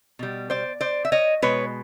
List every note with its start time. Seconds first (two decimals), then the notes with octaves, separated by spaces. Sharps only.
0.19 B2 G3
0.50 C5 D5
0.81 C5 D5
1.05 E5
1.12 C#5 D#5
1.42 B2 G#3 B4 C#5